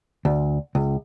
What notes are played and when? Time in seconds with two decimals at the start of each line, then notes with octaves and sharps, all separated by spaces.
0.25 D2
0.75 C#2